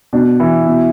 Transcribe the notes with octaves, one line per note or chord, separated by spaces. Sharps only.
B2 D4
E3 E4
B2